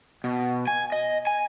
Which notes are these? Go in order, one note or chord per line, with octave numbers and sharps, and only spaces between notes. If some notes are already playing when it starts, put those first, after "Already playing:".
B2
G#5
D#5
G#5